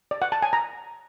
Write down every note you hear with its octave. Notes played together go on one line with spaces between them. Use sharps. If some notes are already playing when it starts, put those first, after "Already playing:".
D5
F#5
A5
G#5
A#5